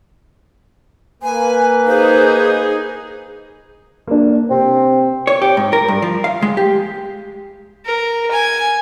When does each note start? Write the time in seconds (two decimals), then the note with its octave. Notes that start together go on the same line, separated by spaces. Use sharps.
1.23 A#3 B4 G#5
1.87 D#4 G#4 C5
4.07 A#3 D4
4.50 C3 C4
5.27 C#5
5.42 G4
5.57 G#2
5.73 A#4
5.88 G2
6.02 F3
6.24 F5
6.42 G#3
6.57 G4
7.85 A#4
8.31 G#5